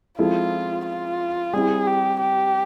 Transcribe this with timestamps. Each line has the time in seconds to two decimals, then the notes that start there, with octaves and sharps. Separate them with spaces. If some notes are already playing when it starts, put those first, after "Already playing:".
0.19 F3 G#3 C4 E4 F4 A4
0.86 F4
1.53 G3 C4 E4 G#4
1.87 G4
2.20 G4